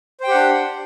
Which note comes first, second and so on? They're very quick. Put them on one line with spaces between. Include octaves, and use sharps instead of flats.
C5 G5 G4 F#5 D4